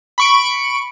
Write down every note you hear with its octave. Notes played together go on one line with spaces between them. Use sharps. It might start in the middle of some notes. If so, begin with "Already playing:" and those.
B5 C#6 D7